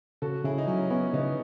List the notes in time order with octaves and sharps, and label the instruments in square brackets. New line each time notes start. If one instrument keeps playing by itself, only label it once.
[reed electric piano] C#3 [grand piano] F#4 A4
[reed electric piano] C#3 [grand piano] E4 G#4
[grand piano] D#4
[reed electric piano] F#3 [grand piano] C#4
[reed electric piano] B3 [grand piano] C#4 E4
[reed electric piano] C#3 [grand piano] B3 D#4